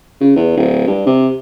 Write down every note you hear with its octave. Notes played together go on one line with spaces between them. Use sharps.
C#3
E2
D1
G2
C3